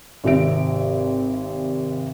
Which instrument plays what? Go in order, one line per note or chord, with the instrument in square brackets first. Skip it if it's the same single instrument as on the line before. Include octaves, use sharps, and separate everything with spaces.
[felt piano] G#1 C3 E5 D7